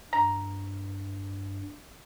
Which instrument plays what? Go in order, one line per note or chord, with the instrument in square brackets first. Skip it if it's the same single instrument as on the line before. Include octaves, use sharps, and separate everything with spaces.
[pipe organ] G2 [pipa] A#5